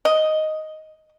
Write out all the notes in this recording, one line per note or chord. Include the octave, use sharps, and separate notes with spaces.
D#5